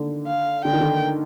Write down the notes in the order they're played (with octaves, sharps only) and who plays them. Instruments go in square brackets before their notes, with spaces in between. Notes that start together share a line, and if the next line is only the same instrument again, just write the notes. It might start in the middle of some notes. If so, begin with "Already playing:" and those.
Already playing: [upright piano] D3 D#3
[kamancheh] F5
[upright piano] D3 [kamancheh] G5
[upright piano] D#3
D3